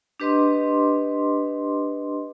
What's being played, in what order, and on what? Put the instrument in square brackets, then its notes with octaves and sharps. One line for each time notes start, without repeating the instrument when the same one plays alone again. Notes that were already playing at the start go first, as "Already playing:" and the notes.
[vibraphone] D4 G4 B4 D#5 C6 D6